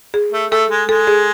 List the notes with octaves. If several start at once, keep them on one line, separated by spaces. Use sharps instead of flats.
G#4
A3
A3 A4
G#3
G#3 A4
G#4